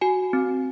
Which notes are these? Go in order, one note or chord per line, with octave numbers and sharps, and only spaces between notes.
F#4 G#5
C4